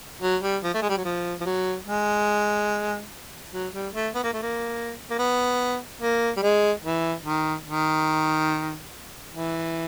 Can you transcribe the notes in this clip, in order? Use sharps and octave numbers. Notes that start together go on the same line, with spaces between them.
F#3
G3
F3
A3
G#3
G3
F#3
F3
F3
F#3
G#3
F#3
G3
A3
B3
A#3
A3
A#3
A#3
B3
A#3
G3
G#3
E3
D#3
D#3
E3